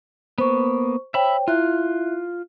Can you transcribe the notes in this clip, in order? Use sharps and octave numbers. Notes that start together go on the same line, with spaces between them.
A#3 B3 C5 C#6
C5 C#5 E5 G5 B5
E4 F4 E5 F#6